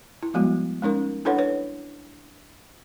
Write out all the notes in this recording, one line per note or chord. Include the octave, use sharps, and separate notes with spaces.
E4
F3 G3 G#3 B3 F#4
G#3 C#4 D#4 A#4
D4 E4 A4 B4 C#5 F#5
B4 C#5